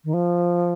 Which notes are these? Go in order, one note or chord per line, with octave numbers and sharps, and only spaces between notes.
D#3
F3